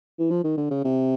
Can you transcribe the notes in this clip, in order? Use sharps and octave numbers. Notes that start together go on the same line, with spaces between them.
E3
F3
D#3
D3
C#3
C3